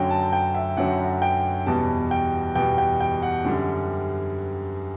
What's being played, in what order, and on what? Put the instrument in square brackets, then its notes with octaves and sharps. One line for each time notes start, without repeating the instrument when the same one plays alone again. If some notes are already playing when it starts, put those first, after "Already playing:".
Already playing: [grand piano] F#2 D3 F#3 G5
A5
G5
E5
F#2 D3 F#3 F#5
G5
E2 B2 G3 A5
G5
E2 B2 G3 G5
G5
G5
F#5
F#2 D3 G3